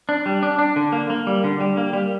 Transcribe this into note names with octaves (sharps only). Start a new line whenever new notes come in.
D4
G3
D4
D4
D3
A#3
A#3
G3
D3
G3
A#3
G3